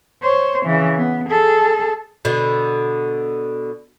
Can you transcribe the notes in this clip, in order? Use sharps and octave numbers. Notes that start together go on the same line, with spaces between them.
C5 C#5
C#3 E3
B3
G#4 A4
B2 D3